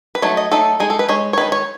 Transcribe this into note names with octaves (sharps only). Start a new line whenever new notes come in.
B4
F#3 A3 D#4 C#5
D#5
F#3 A3 D#4 A4
G#3 D#4 G#4
A4
B4
G#3 D#4 C#5
C#5
D#3 G#3 D#4 B4
C#5